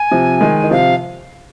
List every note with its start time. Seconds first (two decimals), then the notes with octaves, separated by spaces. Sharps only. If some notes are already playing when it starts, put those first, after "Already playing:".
Already playing: G#5
0.12 C3 F3
0.41 D#3 G#3
0.64 D#3
0.71 C3 F3 F5